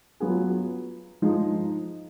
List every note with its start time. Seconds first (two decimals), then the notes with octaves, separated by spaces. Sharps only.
0.20 F#3 B3 F4 G#4
1.22 F3 G#3 D#4 G#4